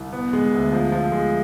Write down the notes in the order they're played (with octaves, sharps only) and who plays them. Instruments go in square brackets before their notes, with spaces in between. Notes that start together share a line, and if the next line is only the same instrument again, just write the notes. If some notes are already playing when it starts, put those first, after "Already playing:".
Already playing: [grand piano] C2
B3
G#3
D2
F3
F3
G#3